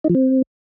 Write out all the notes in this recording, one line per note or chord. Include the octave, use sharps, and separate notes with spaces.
D#4
F3
C4